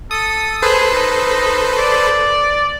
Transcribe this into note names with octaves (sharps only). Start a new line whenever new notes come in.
A4 D#6
G#4 A4 B4 C5
D#4
D5